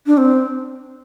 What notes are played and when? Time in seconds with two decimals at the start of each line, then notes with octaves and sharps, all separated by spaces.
0.06 D4
0.17 C4